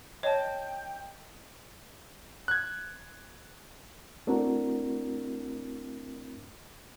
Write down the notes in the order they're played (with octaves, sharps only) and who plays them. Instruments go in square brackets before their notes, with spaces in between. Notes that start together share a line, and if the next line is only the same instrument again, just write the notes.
[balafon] C#5 [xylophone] D#5 A5 [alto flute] G5
[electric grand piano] F#6 G#6
[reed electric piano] A3 C4 D4 E4 F#4 A#4